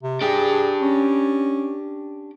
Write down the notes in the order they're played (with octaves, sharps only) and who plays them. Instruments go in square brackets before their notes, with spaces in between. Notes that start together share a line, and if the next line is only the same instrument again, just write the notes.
[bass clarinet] C3
[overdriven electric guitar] D4 G4 [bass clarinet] G#4
[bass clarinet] C#4